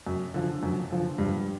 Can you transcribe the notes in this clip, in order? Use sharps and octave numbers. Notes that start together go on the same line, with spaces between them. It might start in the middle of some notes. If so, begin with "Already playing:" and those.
F#2
D3 F3
F#2
D3 F3
G2